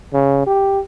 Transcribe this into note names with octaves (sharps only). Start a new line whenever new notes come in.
C#3
G4